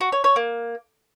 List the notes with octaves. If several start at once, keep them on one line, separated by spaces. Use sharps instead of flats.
F#4
C#5
C#5
A#3